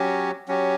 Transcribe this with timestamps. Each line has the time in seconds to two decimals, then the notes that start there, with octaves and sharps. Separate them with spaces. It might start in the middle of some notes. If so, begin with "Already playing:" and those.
Already playing: F#3 C#4 G4
0.48 F#3 C#4 G4